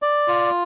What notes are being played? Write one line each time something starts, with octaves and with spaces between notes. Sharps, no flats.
D5
F4